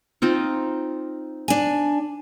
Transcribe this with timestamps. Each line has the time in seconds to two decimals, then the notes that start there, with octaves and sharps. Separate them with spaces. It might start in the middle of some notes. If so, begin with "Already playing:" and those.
0.22 C4 D#4 F4
1.48 D4 G#5